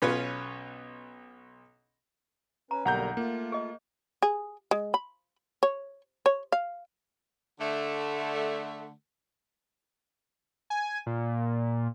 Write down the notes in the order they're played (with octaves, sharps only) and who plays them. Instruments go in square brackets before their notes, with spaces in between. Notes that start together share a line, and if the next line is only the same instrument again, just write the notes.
[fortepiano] B1 C#4 F4 B4 C#5
[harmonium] C#4 B4 [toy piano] A#5
[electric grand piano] B1 A#5 G6 [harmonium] D3 G3 A#3 [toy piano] F#5
[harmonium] A3 F4 [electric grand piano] A#3
[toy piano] G#4 D#5
[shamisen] G#4
G#3
B5
C#5
C#5
F5
[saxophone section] D3 A3
[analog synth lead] G#5
A#2